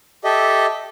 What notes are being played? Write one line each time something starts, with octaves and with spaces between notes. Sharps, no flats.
G4 A4 D#5 E5